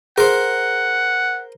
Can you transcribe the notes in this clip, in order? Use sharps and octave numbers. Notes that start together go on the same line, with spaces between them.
G#4 A#4 C5 F#5